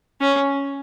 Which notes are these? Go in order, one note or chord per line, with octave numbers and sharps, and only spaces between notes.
C#4